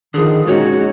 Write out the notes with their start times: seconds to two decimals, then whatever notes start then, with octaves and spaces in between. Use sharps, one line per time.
0.14 D3 D#3 F3 G#4
0.47 A#2 G#3 C#4 D#4 F#4 C#5